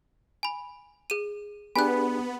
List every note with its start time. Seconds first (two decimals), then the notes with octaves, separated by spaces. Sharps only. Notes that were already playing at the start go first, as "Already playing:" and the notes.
0.43 G#5 B5
1.10 G#4 D#7
1.76 B3 D4 G4 G#4 G#5 B5 F#6